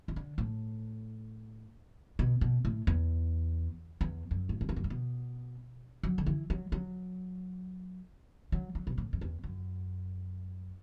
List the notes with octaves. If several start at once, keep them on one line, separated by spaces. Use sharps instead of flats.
E3
D3
A2
B2
B2
A2
E2
E2
F#2
A2
F#2
E2
F#2
A2
B2
F#3
D3
E3
F#3
F#3
F#3
F#3
B2
A2
F#2
E2
F#2